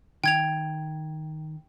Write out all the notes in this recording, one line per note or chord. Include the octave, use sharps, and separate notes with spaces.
D#3 G5 G#6 F7